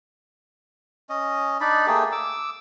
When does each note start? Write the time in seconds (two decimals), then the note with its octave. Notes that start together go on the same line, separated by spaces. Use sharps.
1.09 C#4 D#5
1.61 D4 D#4 D5 B5
1.87 A3 A#3 G4 G#4
2.12 D6 E6